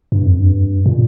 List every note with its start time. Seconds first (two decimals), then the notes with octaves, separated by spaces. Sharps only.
0.12 G2
0.26 F2
0.39 G2
0.86 A#2